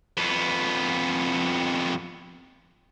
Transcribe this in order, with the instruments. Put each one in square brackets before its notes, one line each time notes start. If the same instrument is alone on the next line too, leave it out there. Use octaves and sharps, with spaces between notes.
[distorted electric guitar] F2 B3